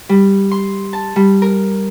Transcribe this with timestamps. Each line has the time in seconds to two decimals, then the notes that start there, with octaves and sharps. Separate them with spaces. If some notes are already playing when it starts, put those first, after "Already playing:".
0.09 G3
0.51 C6
0.93 A5
1.16 G3
1.42 A#4